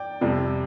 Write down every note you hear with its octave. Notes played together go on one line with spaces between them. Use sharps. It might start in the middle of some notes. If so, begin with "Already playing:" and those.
Already playing: D5 G5
F2 C3 G3